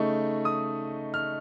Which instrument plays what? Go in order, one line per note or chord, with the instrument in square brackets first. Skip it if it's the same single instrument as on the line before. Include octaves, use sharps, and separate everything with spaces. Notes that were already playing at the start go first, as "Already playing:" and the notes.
Already playing: [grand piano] C#3 A3 D#4 C#6
D#6
F6